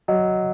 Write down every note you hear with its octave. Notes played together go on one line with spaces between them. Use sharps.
F#3 D#5